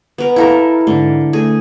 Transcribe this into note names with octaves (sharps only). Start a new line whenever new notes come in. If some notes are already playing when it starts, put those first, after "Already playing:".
B3 A#4
E4 A4 A#4 F5 A#5
G#2 D3
A3 G#4